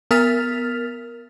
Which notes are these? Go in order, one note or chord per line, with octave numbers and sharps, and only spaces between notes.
B3 A#4 F6 A6 B6 F7